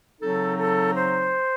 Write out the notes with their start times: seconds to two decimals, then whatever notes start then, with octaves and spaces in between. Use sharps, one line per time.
0.21 C#3 F#3 C4 D#4 A4
0.59 A4
0.95 C5